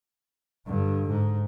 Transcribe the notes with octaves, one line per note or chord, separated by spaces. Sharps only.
G2 D3
G#2